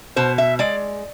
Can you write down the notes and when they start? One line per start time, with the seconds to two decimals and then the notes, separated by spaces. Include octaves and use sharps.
0.16 B2 C5
0.38 E5
0.59 G#3 D5